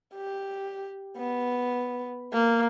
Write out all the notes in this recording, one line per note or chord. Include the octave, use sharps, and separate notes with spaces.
G4
B3
A#3